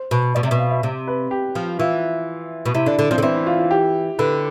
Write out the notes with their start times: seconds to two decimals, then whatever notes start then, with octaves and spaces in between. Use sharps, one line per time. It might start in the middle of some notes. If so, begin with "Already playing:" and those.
Already playing: C5
0.11 B2
0.35 B2 D5
0.43 C3
0.47 B2 E5
0.59 F5
0.71 E5
0.83 C3
1.07 B4
1.31 G4
1.55 F3
1.79 E3 F4
2.65 B2
2.75 C3 E4
2.86 D3 D4
2.99 D3
3.11 F3 C4
3.18 D3
3.22 E3 C4
3.35 E4
3.46 F4
3.59 F4
3.71 G4
4.19 D3 B4